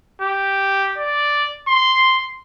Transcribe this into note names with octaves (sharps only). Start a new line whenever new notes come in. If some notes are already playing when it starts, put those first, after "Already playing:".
G4
D5
C6